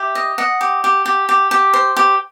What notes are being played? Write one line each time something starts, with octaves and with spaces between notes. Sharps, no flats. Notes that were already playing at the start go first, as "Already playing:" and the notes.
Already playing: G4 E5
D#5
D#5 F#5
G4
G4
G4
G4
G4
C5
G4